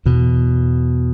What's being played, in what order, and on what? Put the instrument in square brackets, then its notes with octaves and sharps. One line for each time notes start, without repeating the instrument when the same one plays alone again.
[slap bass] E2 B2